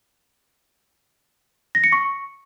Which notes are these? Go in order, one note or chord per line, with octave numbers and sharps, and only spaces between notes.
A#6
C#7
C#6